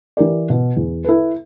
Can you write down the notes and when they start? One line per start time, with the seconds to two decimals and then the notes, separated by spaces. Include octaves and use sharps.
0.17 E3 G4 A#4 D5
0.50 B2
0.77 E2
1.04 E4 A4 B4